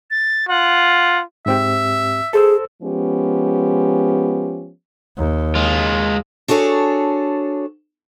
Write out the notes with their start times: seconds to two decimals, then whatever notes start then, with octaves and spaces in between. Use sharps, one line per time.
0.11 A6
0.49 F4 F#5
1.46 G#2 C4 G4 E5
2.33 G#4 A4 C5 E6
2.82 F3 G#3 B3 C#4 G4
5.17 D#2
5.55 G#3 F4
6.48 D4 F#4 G#4 A4 C#5